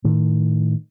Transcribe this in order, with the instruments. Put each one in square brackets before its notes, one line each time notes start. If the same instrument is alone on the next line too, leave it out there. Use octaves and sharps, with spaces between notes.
[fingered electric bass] A2 D#3